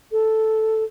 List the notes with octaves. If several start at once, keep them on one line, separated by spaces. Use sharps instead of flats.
A4